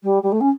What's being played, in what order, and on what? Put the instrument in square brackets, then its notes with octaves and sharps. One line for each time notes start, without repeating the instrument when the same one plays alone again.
[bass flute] G3
G3
A3
C#4